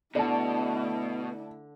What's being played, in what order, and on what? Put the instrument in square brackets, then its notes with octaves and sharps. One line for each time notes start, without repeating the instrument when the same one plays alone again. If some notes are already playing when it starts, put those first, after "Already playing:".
[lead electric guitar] B2 [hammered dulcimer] D3 [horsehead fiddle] A3 E4 [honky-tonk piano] D5 A5